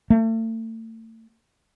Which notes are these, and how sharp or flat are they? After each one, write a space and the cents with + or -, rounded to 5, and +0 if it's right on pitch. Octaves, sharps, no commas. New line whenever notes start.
A3 +35